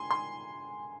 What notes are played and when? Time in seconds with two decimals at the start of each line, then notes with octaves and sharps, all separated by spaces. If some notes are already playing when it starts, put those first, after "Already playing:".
Already playing: G#5 C6
0.11 C6